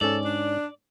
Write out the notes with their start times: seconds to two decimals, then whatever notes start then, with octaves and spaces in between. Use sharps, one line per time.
0.01 G#2 C#4 A4 D5
0.25 D4